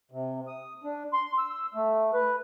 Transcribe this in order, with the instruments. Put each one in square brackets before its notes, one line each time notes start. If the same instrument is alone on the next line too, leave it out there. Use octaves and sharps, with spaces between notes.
[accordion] C3
D#6
D4
C6
E6
A3
B4